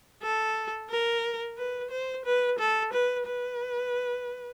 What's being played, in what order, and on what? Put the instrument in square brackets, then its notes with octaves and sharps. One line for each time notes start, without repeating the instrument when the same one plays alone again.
[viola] A4
A#4
B4
C5
B4
A4
B4
B4